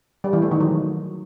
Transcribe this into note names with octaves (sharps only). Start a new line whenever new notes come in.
G3
E3
A3
D#3
F#3